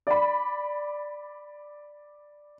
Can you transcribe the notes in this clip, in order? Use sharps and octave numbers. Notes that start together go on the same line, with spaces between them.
D5 B5